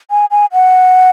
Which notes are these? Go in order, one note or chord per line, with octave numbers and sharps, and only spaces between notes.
G#5
G#5
F#5